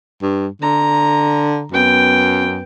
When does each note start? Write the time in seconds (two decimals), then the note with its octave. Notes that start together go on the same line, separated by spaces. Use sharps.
0.22 G2
0.62 D3 A#5
1.72 F#2 B3 G5